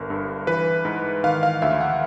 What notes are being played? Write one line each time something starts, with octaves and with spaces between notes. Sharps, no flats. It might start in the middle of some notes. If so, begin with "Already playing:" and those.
Already playing: G1 A#4
G2
E3 B4
G#2
D#3 F5
F5
D2 E5
F#5